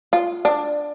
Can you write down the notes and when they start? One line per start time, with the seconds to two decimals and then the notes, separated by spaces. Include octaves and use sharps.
0.13 F4
0.45 D4